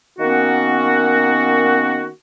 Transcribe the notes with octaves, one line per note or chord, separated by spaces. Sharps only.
D#3 A#3 B3 C#4 F#4